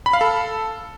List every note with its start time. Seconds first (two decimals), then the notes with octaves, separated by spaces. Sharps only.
0.06 B5
0.13 F5
0.21 A4